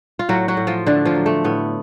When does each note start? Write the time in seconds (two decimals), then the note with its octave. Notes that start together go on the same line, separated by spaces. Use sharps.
0.19 F4
0.29 A2 F#3 F#4
0.48 F#3 F#4
0.57 A2
0.67 F3 F4
0.86 D3 A3 D4
1.05 F3 F4
1.15 F#3
1.26 A3
1.44 A2 B3